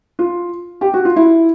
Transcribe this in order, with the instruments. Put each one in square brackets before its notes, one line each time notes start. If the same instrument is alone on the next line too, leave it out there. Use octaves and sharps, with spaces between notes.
[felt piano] F4
G4
F#4
F4
E4